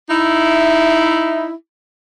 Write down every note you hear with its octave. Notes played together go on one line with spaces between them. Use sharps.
D#4 E4